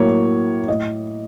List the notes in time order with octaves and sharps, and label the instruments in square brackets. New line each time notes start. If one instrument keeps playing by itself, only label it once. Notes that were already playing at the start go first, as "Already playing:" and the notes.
Already playing: [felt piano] A2 F#3 A#3 C#5
A2 D#5